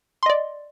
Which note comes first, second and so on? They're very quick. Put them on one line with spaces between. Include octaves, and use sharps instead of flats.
C6 D#5 D5